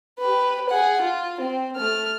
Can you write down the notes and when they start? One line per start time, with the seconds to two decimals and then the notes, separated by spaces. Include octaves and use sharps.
0.18 G4 B4
0.69 G#4 F#5
1.01 F4
1.40 C4
1.76 A3 F6